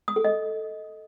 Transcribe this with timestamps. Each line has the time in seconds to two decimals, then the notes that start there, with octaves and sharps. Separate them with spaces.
0.08 D#6
0.16 A4
0.24 D#5